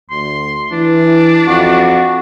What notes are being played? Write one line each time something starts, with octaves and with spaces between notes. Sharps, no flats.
D2 C6
E3 D4
F2 F#4